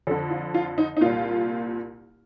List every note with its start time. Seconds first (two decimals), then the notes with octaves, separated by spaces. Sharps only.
0.07 F2 A4
0.11 D3
0.31 F4
0.54 F4
0.78 D#4
0.97 D#4
1.01 C2 A#2 F4